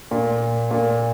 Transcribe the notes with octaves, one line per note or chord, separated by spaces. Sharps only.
A#2
A#2